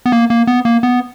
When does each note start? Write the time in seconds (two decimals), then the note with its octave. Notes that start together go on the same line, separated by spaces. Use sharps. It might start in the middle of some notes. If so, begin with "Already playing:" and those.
0.06 B3
0.12 A#3
0.30 A#3
0.47 B3
0.65 A#3
0.83 B3